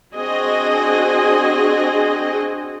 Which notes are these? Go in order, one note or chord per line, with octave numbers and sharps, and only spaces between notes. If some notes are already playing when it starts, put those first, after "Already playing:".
C4 D4 F#4 G#4 D#5 G#5